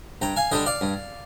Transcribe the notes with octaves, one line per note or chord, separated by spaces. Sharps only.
G2 G5 A#5
F5 G#5
D3 G3 D4 D#5 G5
D5 F5
G2